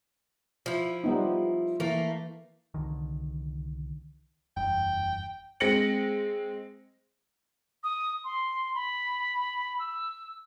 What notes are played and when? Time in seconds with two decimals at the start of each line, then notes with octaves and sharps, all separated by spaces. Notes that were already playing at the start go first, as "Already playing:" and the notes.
0.66 F3 E4
1.04 G3 B3 D#4
1.80 E3 A3 A#3 A#4
2.74 C2 D3 D#3
4.57 F#1 E2 G2 G5
5.60 G#3 C4 A#6 C#7 F#7
7.83 D#6
8.24 C6
8.75 B5
9.79 E6